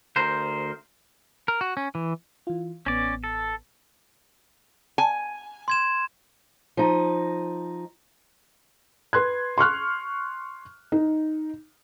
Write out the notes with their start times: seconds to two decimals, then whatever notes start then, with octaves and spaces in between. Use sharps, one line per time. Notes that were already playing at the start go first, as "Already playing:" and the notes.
0.16 D2 A#4 C5
1.48 A#4
1.61 F#4
1.77 C#4
1.95 E3
2.47 E3 F4
2.86 A1 B3 C#4 D5
3.24 A4
4.98 G#5
5.68 C6 G#6 E7
6.77 F3 D#4
9.13 B4 C6 F#6 G#6
9.58 C6 C#6 F6 F#6
10.92 D#4